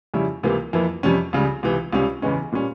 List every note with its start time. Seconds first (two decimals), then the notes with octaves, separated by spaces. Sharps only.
0.14 F2 C#3 G3 C#4 E4
0.43 C#2 C3 E3 A#3
0.73 F2 E3 A#3 E4
1.03 F2 C3 G3 C#4
1.33 C#2 C#3 G3
1.63 C#2 C3 E3
1.93 C#2 C3 G3 C#4
2.22 E2 C#3 E3 G#3 C#4
2.52 A#2 G3 C#4